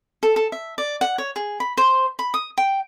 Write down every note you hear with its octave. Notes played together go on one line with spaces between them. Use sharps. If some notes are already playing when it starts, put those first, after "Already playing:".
A4
A4
E5
D5
F#5
C#5
G#4
B5
C5
B5
D#6
G5